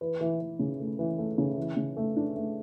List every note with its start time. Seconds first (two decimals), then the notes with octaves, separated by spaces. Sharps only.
0.01 E3 B4
0.21 E3
0.41 E3
0.59 C#3
0.80 A3
0.99 E3
1.18 A3
1.38 C#3
1.58 E3
1.77 C#3
1.97 A3
2.16 D4
2.36 A3